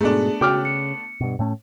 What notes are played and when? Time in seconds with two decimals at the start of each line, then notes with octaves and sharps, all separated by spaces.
0.01 G#2 B2 A3 B3 D4 G#4
0.41 C#3 F#4 G5 D6 F6
0.65 C#7
1.21 G2 B2
1.39 A2 A3 C#4